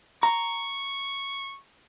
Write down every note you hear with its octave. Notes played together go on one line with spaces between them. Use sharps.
A#5 C#6